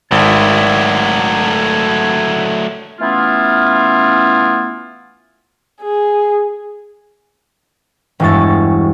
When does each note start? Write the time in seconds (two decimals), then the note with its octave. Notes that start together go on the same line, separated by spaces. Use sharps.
0.12 G#1 F#3 A3 G#6
3.00 E3 A3 B3 C#4 E4 F4
5.82 G#4
8.20 E1 G2 G#3 E4 C#6 A6